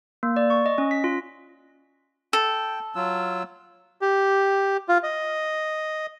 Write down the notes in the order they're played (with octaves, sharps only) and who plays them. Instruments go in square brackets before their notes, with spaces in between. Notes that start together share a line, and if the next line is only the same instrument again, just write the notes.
[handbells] A#3
D5
C#6
D#5
C#4
B6
F4
[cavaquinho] A4 [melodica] G5
[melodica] F#3 F4 E6
[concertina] G4
F4
D#5